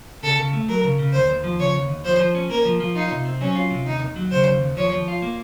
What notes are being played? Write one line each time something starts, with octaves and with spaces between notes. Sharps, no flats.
C#3 A4
C#3
A3
F#3 A#4
C#3
C#3
D#2 C5
D#2
F3
C#3 C#5
D#2
D#2
F3 C5
F3
C#4
A#3 A#4
F3
F3
D#4 F4
C3
C4
F#3 C#4
F4
C3
D#2 D#4
D#2
F#3
C#3 C5
D#2
D#2
F3 C#5
F3
F4
A#3